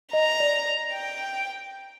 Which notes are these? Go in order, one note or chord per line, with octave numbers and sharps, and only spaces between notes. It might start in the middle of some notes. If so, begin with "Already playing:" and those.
D#5 A#5
D5
G5